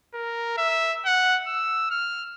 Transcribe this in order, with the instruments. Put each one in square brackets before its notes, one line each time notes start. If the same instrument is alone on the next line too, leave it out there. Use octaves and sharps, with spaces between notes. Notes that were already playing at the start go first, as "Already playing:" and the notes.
[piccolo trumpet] A#4
E5
F#5
E6
F6